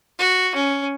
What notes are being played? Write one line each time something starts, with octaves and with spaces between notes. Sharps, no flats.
F#4
C#4